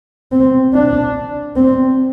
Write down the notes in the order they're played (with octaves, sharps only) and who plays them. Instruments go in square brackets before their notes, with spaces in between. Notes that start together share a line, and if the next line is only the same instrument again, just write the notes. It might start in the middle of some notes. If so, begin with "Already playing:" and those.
[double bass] C4
D4
C4